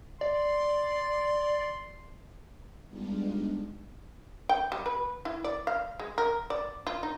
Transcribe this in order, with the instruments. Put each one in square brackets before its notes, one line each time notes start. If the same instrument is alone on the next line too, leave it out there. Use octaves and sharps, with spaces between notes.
[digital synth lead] D5 [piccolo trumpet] C6
[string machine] G3 G#3 B3 D4 D#4 F4
[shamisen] G5
G3
B4
E4
D5
F5
G#3
A#4
D5
F4
D#4